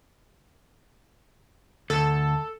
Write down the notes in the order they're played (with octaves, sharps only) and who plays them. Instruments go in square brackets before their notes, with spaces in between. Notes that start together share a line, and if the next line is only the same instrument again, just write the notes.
[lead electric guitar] D2 [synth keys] A4